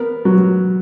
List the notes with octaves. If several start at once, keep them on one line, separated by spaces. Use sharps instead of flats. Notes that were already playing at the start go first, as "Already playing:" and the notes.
Already playing: B3 A#4
F#3